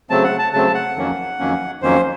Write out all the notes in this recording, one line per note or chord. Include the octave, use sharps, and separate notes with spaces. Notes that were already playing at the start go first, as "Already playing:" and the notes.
C#3 F#3 A3 C4 A5
F#5
A5
C#3 F#3 A3 C4 A5
F#5
F2 D#3 F#3 A#3 C#4
F2 D#3 F#3 A#3 C#4
F2 D#3 F#3 A#3 C#4 C5